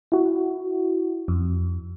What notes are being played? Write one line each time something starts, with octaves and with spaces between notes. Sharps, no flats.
E4 F#4
F2